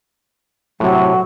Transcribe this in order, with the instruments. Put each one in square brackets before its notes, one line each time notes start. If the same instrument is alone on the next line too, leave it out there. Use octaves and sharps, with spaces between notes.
[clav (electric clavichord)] A2 C3 [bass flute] F#3